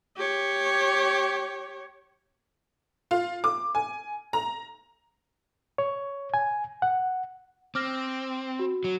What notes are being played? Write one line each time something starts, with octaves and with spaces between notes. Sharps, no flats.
G4 C#5
F4
D6
G#5
A#5
C#5
G#5
F#5
C4 D6 F6 A#6
F#4
F#3